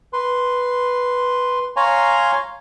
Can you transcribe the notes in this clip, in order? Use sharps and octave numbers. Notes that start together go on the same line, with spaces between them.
B4 C6
C#5 F5 G#5 A#5 C6 C#6